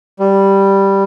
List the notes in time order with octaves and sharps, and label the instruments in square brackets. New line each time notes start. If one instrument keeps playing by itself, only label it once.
[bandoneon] G3